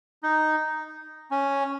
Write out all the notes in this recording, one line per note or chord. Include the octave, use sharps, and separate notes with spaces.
D#4
C#4